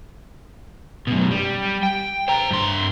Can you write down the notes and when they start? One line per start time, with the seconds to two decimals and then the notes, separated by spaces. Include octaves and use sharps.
1.07 F#2 B2
1.31 G3
1.83 G5
2.28 C5 A#5
2.51 G2 C6